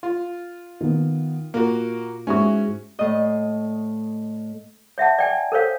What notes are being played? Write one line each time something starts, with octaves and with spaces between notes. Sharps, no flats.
F4
D#3 B3
A#2 A#3 F#4
G#2 G#3 C#4 E4 F#4 C#6
A2 D#5
C#5 E5 F#5 A5
D5 G5 G#5
A4 A#4 C5 C#5 F5